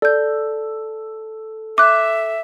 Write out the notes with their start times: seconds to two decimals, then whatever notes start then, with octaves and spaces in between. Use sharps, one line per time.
0.02 A4 D5 G6
1.78 E5 D6 F#6